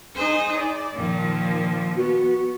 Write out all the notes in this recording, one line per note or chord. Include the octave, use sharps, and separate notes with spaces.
D#4 G#4 C5
D5
A#2 D#3 F3
B3 F#4